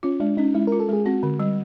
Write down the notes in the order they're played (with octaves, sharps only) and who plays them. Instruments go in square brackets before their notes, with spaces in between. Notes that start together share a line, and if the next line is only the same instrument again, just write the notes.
[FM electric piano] C#4 [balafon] F4
[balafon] G#3 [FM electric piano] D4
[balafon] C#4 [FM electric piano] D#4
[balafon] G#3 [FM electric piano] E4
[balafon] F4 [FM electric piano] A#4
[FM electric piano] A4
[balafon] G#3 [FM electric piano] G#4
[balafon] C4 [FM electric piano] F#4
[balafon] D3
G3